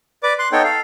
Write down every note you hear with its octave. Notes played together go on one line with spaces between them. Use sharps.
B4 D5 D6
C6 F#6
B3 D#4 A4 C#5 G5
A4 F5